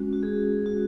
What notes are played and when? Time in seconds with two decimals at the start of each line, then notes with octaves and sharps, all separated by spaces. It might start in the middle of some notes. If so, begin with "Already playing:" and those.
Already playing: G#3 C#4 F#4
0.13 F#4
0.23 G#4
0.66 F#4